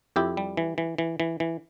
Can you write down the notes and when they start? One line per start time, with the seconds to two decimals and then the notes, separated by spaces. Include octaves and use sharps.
0.16 F2 E4 G4
0.37 G3
0.57 E3
0.78 E3
0.98 E3
1.20 E3
1.40 E3